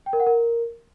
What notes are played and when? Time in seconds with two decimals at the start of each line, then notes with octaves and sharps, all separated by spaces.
0.06 G5
0.13 A#4
0.20 F#5
0.26 A#4